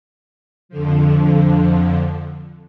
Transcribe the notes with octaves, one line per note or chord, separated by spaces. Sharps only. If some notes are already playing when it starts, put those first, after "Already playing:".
F2 D3 F3